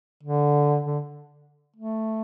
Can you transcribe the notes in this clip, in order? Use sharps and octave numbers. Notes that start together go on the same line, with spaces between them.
D3
D3
A3